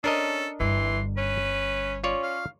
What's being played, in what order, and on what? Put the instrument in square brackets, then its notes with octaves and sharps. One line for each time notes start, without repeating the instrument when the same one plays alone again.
[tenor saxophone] C#4 [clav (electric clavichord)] D4 A#4 D#5 [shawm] A4
[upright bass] G1 G2 [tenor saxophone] E3 [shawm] C6
[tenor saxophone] C#4 [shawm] B4
[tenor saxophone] C#4 [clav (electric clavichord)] F4 C#5 D5
[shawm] F5